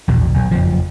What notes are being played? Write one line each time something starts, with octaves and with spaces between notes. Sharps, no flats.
A#1 E2 B2
B1
F#1 F2 F3